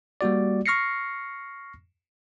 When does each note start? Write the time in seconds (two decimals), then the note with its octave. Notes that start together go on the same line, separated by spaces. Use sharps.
0.21 G3 A#3 F#4 D5
0.66 C#6 F6 A#6 C7 C#7